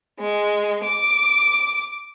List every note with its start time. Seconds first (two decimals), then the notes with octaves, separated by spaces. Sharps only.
0.20 G#3
0.84 D6